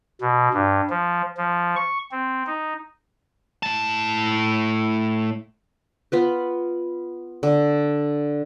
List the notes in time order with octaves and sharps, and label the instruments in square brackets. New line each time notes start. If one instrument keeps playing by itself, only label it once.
[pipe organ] B2
G2
F3
F3
C#6
C4
D#4
[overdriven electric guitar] A2 A5
[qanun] B3 F4 B4
D3